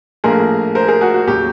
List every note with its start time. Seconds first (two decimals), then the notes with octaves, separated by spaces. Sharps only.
0.24 A#1 A2 F3 A#3 G#4 A#4
0.75 A#4 C5
0.88 G#4 A#4
1.01 F#4 G#4
1.14 F#4
1.27 D#2 C#3 F#3 G4